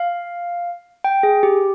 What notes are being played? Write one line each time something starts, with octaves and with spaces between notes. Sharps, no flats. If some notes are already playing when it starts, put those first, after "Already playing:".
Already playing: F5
G5
G#4
G4